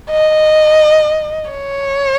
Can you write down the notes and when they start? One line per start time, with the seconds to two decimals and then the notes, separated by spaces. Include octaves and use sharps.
0.10 D#5
1.51 C#5